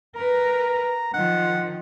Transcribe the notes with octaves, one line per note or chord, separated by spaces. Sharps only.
A#4 B4 A#5
D#3 F3 F#5